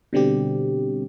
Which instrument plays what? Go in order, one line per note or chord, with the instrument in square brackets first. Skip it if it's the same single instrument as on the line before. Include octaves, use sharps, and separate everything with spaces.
[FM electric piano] B2 D3 G3 C4 G4